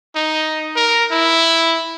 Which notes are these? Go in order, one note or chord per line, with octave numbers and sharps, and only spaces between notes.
D#4
A#4
E4